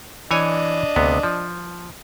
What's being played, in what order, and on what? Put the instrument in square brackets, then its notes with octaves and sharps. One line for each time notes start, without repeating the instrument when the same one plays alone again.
[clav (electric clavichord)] E3 C#5 G#5 [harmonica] D4 D#5
[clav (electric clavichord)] D2 C3 B3
F3